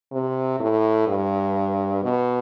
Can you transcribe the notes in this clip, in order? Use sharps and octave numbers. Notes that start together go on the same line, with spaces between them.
C3
A2
G2
B2